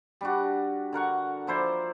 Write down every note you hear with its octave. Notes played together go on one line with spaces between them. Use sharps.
G3 D4 F#4
D3 A#4 F#5 C#6
F3 E4 C5 D5